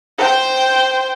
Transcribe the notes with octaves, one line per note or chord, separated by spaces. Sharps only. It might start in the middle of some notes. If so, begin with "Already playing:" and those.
C5 G5